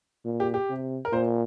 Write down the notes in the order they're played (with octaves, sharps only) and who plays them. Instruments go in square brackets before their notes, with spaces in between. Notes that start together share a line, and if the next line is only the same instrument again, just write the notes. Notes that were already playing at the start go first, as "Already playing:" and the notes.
[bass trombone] A#2
[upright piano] G4
G4
[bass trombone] C3
[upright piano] A#4
[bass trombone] A#2 [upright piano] C5